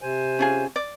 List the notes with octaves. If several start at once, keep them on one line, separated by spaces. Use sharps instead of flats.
C3 C5 G#5
C#4 F4 G#4
D5